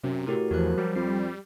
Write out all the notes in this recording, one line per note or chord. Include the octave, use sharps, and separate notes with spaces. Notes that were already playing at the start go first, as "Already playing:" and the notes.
F#2 C3
A2 F#4 G4 A#4
E2 F3 F#4 A#4 F#6
F#3 G3
F2 C7